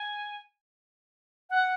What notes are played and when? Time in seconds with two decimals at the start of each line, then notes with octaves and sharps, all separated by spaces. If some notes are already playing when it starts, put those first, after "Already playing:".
Already playing: G#5
1.50 F#5